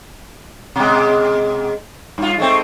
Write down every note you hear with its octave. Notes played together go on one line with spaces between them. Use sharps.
B2 G#3
G2 F4
G#3 A3 C4